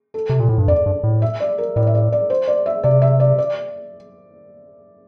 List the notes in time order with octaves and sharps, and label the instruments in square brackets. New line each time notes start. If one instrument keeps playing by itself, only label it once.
[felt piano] A4
[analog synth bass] C3
A#2
A2
G2
[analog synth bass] F2 [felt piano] D5
[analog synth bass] G2
A2
[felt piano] E5
D5
A#4
[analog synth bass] A2 [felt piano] D5
[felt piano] E5
D5
D5
C5
D5
E5
[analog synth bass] C3 [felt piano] D5
[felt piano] E5
D5
D5